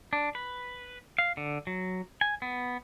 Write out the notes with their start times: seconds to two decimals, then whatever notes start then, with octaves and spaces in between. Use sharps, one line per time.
0.13 D4
0.35 B4
1.18 F5
1.37 D3
1.67 F#3
2.21 G#5
2.42 B3